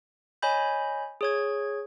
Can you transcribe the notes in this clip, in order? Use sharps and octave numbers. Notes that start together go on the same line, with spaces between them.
C#5 D#5 G#5 B5 G6
G#4 C#5 G#6